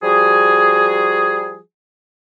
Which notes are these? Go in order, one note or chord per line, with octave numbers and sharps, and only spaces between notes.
F3 G3 F#4 G#4